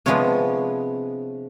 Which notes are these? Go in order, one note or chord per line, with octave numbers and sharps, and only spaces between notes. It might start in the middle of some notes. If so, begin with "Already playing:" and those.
C3 F3 G#3 B3 D4 C#5